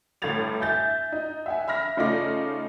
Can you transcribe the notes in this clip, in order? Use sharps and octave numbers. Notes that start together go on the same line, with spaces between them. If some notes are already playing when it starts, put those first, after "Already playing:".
G1 A2 A3 G#6 A6 F7
E5 G#5 G6 A6
D#4
E5 F#5 G#5
E5 B5 F6 A#6
C#3 A3 D#4 F4 D5 A#6